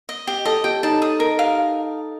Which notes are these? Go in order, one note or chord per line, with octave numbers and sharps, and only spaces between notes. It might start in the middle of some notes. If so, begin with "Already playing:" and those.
D#5
G4
A4 D#5
G4 G5
D#4 A5
D#6
A#4
F5